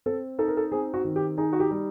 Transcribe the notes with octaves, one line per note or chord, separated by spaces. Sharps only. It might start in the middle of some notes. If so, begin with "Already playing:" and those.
C4 A4
D#4 A4
A#4
A4
C4 G#4
F#4
D#3
G4
D#4 G#4
F#4
G4
G3